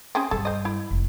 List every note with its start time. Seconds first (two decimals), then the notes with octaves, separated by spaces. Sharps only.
0.15 C4 C#4 G#4
0.31 G2 G3 A4
0.45 C5 D#5
0.65 E4
0.91 F1